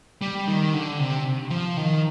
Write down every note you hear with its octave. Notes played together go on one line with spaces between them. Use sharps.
G3
D#3
D3
C3
F3
D#3